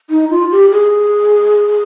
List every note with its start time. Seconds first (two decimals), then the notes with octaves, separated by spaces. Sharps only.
0.10 D#4
0.30 F4
0.51 G4
0.72 G#4